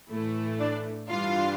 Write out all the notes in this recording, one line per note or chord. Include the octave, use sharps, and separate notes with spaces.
A2 E3 A3 E4
D4 D5
G2 E3 G3 D4 F4 F5